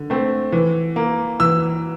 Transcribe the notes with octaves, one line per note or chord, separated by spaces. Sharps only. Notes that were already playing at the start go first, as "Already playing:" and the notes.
Already playing: D3
A3 C4
E3
A#3
E3 E6